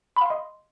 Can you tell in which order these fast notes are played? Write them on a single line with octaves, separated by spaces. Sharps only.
B5 F5 C6 D#5